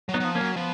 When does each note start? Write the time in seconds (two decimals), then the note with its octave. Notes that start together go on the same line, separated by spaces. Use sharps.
0.09 F#3
0.14 B3 D#4
0.20 F#3
0.24 F3
0.35 A#3 C#4
0.41 F#3
0.56 F3 B3